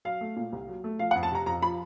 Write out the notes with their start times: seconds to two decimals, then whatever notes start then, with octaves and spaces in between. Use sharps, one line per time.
0.05 F#3 F5
0.21 A3
0.36 A#2
0.52 C2
0.68 F#3
0.84 A3
0.99 F3 F5
1.11 F#5
1.15 F2
1.23 A5
1.31 C3 A#5
1.46 F2 A#5
1.62 F3 B5